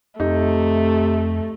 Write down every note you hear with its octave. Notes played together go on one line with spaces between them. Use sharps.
F2 C3 A3 D#4